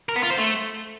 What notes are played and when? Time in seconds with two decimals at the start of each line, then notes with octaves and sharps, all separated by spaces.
0.09 A#4
0.16 B3
0.23 F4
0.30 C5
0.37 A3